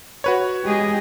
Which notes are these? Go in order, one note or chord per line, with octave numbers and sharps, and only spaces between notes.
F#4 B4 C#5
G#3 G4 G#4 D#5